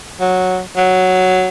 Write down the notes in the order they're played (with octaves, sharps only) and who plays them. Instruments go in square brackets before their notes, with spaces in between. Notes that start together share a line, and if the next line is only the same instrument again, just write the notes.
[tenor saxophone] F#3
F#3